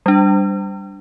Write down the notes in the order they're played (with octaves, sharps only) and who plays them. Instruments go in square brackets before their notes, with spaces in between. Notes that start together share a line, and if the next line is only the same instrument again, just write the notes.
[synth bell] G3 D4